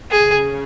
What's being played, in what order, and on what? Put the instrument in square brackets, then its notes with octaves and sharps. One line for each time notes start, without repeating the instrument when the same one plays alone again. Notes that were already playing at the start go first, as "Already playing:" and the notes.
[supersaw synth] C#3 [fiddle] G#4